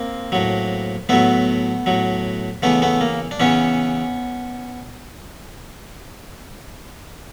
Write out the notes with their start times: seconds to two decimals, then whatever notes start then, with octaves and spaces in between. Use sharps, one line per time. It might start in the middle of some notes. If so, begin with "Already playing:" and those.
Already playing: A#3 C4
0.32 A2 F#3
1.09 A2 F#3 A3 B3
1.86 A2 F#3
2.62 C#3 E3 A3 B3
2.82 A3 B3
3.01 A#3
3.31 D4
3.40 C#3 E3 B3 C#4